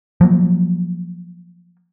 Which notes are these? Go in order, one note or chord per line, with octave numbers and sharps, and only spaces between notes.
F3 F#3 A#3